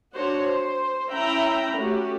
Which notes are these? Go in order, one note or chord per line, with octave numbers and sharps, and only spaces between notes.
D4 F#4 C5 C#5
C5
C#4 E4 E5 G5 A#5 B5
A3 C#4 F#4 G4